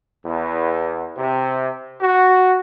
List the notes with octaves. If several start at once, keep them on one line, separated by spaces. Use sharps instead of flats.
E2
C3
F#4